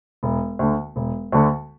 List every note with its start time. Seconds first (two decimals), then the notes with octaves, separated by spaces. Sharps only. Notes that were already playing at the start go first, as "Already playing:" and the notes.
0.23 E1
0.59 D2 D3
0.96 E1
1.32 D2 D3